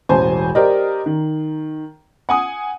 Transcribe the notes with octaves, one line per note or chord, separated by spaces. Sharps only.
E1 A1 C5 G#5 A5
G4 A#4 C5 D5 D#5
D#3
F#5 G#5 D#6